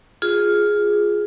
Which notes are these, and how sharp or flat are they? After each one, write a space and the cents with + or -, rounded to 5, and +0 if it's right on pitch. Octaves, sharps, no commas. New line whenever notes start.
F4 +5 G#4 +0